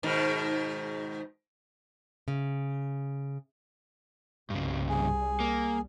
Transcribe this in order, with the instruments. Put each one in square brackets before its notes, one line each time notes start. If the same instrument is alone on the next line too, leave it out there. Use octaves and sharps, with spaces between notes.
[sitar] G#2 B2 D#3
[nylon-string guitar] C#3
[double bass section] C2 G3 [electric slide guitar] G2 C#3
[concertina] G#4
[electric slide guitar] A#3